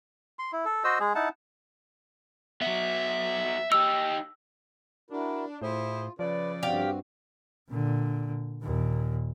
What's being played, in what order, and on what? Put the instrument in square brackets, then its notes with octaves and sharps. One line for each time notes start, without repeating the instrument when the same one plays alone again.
[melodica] C6
E4
A4
F#4 C5 D#5 E6
G#3 G#4
D#4 E4 F#5 A5
[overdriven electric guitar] F#3 B3 [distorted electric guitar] E5
[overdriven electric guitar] D#4 G4 [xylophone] E6
[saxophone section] D4 [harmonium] E4 F#4 A#4
[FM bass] A2 [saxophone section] E4 G#4 C5 [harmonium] F4
[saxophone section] C#3 D5 [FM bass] F3 [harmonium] B4
[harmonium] G2 C4 F#4 [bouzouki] G4 F5
[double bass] A#2 D3
D#2 A#2